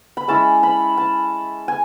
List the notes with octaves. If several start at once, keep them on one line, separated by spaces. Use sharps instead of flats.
B5
G#3 C#4 E4 A5
B5
A5
G#5